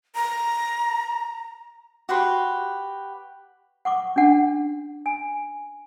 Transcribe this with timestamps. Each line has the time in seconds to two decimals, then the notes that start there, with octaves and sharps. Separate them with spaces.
0.15 A#5
2.09 F#4 G4 B4 C6
3.85 F#5 C#6 D6
4.16 C#4 D4 F#5
5.06 G#5